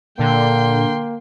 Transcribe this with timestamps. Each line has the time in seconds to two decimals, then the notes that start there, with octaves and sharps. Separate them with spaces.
0.19 A#2 D3 A#3 G5 C6